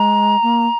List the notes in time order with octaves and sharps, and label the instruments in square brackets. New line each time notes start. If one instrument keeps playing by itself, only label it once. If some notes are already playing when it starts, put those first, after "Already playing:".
Already playing: [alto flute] G#3 [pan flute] A#5
[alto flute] A#3